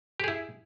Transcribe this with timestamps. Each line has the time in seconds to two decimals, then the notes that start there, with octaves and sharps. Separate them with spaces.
0.20 G4
0.24 G#4
0.28 E4